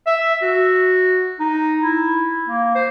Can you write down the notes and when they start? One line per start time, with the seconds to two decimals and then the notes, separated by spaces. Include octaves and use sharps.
0.07 E5
0.42 F#4
1.40 D#4
1.81 E4
2.48 A#3
2.75 C5